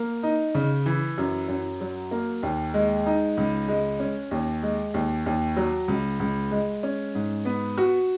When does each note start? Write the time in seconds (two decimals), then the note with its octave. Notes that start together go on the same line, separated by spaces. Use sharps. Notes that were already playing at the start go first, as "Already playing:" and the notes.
Already playing: A#3
0.23 D#4
0.55 C#3
0.86 E3
1.18 F#2
1.48 F#2
1.81 F#3
2.11 A#3
2.43 D#2
2.74 G#3
3.06 D#4
3.37 C#2
3.68 G#3
4.00 C#4
4.31 D#2
4.63 G#3
4.94 D#2
5.26 D#2
5.57 F#3
5.88 C#2
6.20 C#2
6.51 G#3
6.83 C#4
7.15 G#2
7.45 B3
7.78 F#4